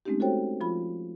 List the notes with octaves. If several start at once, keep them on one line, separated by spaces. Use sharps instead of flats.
G#3 A3 C4 C#4 D#4 G4
F#4 A4 C5 C#5 G5
F3 F4 B5